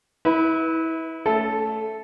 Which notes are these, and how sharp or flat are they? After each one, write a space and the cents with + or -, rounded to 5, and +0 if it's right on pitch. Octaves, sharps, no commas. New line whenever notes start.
E4 -30 B4 +0
A3 +0 C#4 +20 A4 -10